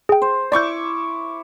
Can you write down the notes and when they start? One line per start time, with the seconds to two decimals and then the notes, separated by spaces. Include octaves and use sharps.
0.09 G#4 G5
0.22 C5
0.52 E4 D5 C#6 D6 G6